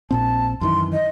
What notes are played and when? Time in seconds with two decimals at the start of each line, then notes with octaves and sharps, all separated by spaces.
0.11 A#1 A#2 C4 A5
0.61 F#2 D#3 E3 C6
0.92 D#5